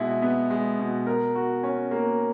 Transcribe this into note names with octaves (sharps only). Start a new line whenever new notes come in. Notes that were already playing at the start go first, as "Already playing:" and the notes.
Already playing: B2 G#3 B3 E4
B3
G#3
B2
A#4
F#4
C#4
A#3